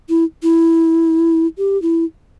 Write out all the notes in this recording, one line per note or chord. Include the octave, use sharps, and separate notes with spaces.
E4
E4
G4
E4